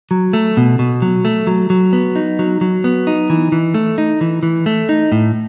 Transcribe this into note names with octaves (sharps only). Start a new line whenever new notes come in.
F#3
A3
B2
B2
F#3
A3
F#3
F#3
B3
D#4
F#3
F#3
B3
D#4
E3
E3
A3
D#4
E3
E3
A3
D#4
A2